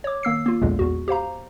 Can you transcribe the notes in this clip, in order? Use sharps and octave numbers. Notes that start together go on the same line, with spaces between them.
C#5 D6
D#3 A#3 E6 C7
A#3 F4
A#1 E2 A#2 D3 G#3
E2 F#4
G4 C5 F5 A#5